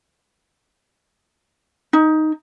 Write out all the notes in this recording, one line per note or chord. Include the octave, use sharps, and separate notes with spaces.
D#4